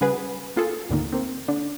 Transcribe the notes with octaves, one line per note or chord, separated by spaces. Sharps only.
C#3 G3 F#4 G#4 B4
A#3 F4 G#4 A4
D2 G#2 D3 D#3 A#3
A#3 C4
D3 D4